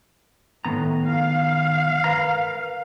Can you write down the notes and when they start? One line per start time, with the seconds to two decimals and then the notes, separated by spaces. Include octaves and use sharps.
0.65 A2 D#3 B3 A#5
1.06 F5
2.04 A#4 B4 A#5